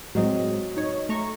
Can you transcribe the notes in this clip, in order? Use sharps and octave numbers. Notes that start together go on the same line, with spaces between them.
A2 F#3 G#3 C4 D#5
D#4 C#5
A3 A#5 C#6